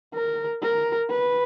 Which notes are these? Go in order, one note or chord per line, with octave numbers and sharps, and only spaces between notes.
A#4
A#4
B4